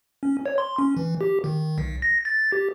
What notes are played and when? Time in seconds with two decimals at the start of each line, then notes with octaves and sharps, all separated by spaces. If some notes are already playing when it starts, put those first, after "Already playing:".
0.23 C#4
0.46 C#5
0.58 C6
0.79 C#4
0.97 E3
1.21 G4
1.44 D#3
1.78 B1
2.02 A#6
2.25 A6
2.52 G4